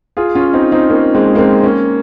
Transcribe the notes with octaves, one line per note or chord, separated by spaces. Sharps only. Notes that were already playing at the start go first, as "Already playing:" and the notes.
F4 G#4
C#4 F4
C4 D#4
C4 D#4
A#3 C#4
G#3 C4
A#3
G#3 C4
A#3 C#4